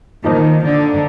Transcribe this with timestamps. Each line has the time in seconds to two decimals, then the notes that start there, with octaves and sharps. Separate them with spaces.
0.24 A#2 D#3 F3 A#3 D#4 A#4
0.63 D3